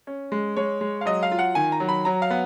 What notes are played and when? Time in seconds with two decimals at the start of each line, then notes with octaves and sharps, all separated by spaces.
0.07 C#4
0.32 G#3
0.56 G#3 C#5
0.81 G#3
1.01 F5
1.05 F#3 D#5
1.23 F5
1.32 F4
1.39 F#5
1.55 D#3 G#5
1.72 A#5
1.80 F#3
1.89 B5
2.05 F#3 A#5
2.22 F5
2.30 B3